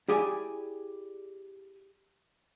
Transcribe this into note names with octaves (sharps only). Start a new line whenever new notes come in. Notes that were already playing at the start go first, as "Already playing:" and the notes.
E4 G4 G#4 D5 G#5